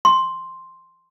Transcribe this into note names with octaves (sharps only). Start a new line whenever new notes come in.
C6